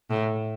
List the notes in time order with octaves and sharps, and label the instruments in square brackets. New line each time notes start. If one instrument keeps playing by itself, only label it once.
[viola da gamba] A2